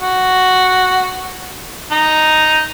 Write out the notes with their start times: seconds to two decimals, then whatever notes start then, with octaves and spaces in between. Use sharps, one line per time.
0.01 F#4
1.92 D#4